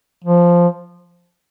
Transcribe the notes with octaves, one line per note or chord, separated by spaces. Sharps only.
F3